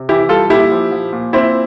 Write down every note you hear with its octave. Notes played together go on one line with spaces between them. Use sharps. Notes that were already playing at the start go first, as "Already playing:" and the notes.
Already playing: C3
E3 E4 G4
G3 F4 A4
A#2 E4 G4
F3
F3
A#2
A#2 C4 E4